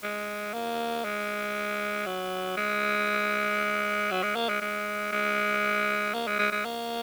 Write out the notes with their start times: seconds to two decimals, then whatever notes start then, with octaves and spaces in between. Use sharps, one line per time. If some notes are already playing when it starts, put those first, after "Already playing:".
0.03 G#3
0.54 A#3
1.04 G#3
2.06 F#3
2.57 G#3
4.11 F#3
4.23 G#3
4.36 A#3
4.49 G#3
4.62 G#3
5.12 G#3
6.14 A#3
6.27 G#3
6.39 G#3
6.52 G#3
6.65 A#3